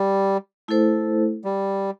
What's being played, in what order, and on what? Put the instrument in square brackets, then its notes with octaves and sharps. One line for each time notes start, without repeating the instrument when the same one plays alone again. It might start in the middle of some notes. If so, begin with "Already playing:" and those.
Already playing: [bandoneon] G3
[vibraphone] A3 E4 A4 C5
[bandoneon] G3